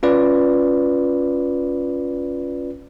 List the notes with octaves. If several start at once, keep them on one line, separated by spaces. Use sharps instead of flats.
C#4 F4 B4 D5